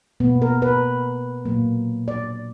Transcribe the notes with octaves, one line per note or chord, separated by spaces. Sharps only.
B2 A#3 B3
A#4
B4
A#2 F#3 A#3
D5